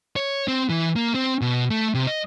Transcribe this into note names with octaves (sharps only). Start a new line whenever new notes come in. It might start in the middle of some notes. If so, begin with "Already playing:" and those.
C#5
C4
E3
A#3
C4
B2
A3
C3
D#5